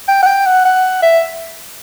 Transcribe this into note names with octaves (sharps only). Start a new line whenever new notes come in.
G5
F#5
G5
F#5
F#5
E5